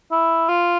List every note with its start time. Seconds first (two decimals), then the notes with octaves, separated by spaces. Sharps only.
0.12 E4
0.49 F4